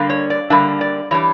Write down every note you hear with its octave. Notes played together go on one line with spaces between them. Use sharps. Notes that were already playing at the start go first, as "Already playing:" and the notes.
Already playing: D3 G3 A#3 D4
C#5
D5
D3 G3 A#3 D4 E5
D5
E3 G3 D4 C#5